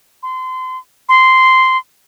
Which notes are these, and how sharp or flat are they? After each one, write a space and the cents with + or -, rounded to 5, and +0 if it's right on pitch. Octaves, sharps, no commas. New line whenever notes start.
C6 -30
C6 -10